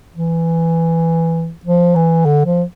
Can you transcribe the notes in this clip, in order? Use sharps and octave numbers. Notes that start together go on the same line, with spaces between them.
E3
F3
E3
D3
F3